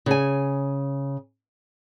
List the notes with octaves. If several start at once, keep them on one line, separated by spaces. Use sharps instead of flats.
C#3 G#5